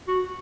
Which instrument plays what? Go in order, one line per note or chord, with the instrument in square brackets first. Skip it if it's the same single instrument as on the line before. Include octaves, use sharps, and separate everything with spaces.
[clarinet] F#4